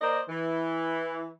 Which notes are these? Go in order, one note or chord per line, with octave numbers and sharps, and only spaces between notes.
A#3 A#4 C5 D5 D#5
E3